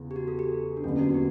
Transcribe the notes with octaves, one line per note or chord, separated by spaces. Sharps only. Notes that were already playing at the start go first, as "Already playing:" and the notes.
Already playing: E2 C#3
G4
F#4
A4
G4
D4
F#1 E2 D3 C#4
F#4
F#4
G4